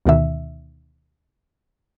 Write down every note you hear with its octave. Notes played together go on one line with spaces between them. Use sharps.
D2 B2 D#3 E5